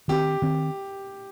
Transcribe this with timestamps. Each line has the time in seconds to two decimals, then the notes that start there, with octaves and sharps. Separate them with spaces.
0.08 D#3 C4 G4
0.42 D#3 C4